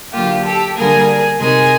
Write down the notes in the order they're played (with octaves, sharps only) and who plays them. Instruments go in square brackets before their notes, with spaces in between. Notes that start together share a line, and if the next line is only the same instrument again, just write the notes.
[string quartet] D3 F#3 A#3 F4 G4
G4 A4
D3 G3 A#3 G#4 A#4
C3 D#3 G#3 G#4 A#4